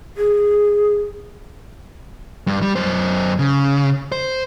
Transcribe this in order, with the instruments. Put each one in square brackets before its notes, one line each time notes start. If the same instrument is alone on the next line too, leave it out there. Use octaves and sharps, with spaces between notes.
[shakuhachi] G#4
[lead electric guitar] G2
G3
F#2 C5
C#3
C5